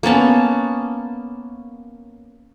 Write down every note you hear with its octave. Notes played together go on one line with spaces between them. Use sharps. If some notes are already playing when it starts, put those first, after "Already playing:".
A#3 B3 C#4 A5